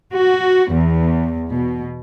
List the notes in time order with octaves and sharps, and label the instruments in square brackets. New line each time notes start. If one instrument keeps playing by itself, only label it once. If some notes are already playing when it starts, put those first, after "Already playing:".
[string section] F#4
E2
B2